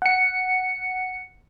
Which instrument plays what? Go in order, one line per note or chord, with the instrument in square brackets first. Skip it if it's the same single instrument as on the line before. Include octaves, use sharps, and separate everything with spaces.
[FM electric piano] F#5 C#7